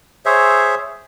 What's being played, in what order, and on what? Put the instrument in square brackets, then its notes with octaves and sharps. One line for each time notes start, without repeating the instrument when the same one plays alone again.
[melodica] G#4 C5 C#5 E5